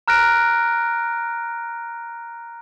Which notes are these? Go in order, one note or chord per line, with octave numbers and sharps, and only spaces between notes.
A#5 F6 F#6 A#6 D7